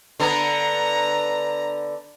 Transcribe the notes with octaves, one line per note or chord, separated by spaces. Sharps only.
D3 B3 A#5